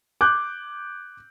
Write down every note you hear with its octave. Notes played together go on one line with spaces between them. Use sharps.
D6 F#6 G6